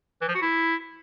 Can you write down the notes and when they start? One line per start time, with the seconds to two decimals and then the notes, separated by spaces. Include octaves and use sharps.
0.21 E3
0.28 F3
0.35 F#4
0.41 E4